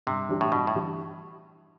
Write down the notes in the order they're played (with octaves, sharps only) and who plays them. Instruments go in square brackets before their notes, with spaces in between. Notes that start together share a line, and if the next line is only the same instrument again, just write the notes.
[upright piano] G2 [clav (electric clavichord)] C3
[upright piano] E3 G3 D4 G4
[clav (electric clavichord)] A2
[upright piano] G2 [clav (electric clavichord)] B2
[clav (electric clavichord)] A2
[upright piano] E3 G3 D4 G4